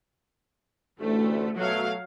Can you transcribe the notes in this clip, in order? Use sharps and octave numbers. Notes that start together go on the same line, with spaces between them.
A1 D2 A3
B2 F#3 A3 F5